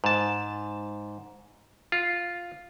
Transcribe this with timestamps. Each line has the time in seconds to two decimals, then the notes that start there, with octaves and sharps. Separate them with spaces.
0.04 G#2 A5
1.92 F4